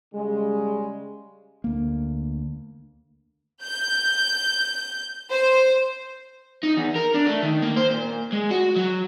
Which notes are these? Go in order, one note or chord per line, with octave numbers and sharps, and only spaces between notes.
C#3 G3 G#3
D2 A#3
G6
C5
D#4
E2
A#4
D4
A3
D#3
A#3
C5
A#2
G#3
F#4
F#3